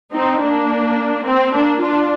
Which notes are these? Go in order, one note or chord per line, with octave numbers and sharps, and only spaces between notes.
C4 D#4
A#3 D4
C4
A#3 D4
D4 F4